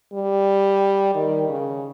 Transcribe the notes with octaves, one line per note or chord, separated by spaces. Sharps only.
G3
D#3
C#3